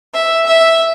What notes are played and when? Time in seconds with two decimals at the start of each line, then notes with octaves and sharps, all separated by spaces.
0.13 E5
0.46 E5